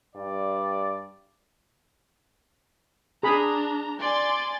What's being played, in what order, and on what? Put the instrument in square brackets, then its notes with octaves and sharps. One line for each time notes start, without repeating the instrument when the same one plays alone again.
[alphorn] G2 [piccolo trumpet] D5
[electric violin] D4 A#5 [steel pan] G#4 B5
[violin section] D5 G#5 A6 [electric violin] C6